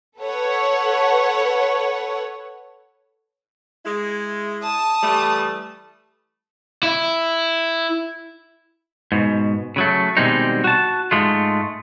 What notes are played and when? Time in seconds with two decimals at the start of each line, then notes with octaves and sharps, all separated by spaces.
0.20 A4 B4 C#5 F#5
3.85 G#3 E4
4.63 A5 D#6
5.03 E3 G3 A3
6.83 E4
9.12 G#2 B2
9.76 C#3 F#3 A3
10.17 B2 D#3 G3 G#3 C4 D#4
10.64 F#4 A5
11.11 G#2 G#3 A3 F4